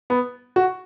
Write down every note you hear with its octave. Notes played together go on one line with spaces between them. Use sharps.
B3
F#4